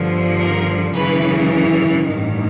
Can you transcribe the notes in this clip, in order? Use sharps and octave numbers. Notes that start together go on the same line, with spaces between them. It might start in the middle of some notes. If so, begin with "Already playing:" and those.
Already playing: G1 G2 D3 F3
A#4
G#1 F#2 C#3 E3 B4
A1 G2 D#3